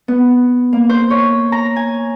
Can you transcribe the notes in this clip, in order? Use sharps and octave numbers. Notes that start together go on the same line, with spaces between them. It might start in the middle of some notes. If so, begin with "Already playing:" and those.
B3
A#3
C5
C#5
A#5
G#5